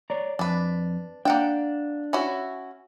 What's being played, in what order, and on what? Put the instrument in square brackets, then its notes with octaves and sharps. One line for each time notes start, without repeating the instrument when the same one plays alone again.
[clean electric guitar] C#5 D5 A#5
[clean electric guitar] F2 [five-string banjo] D4 B4
[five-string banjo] A#3 F#5 G5 [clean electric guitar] D4
[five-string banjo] C#4 E4 F#4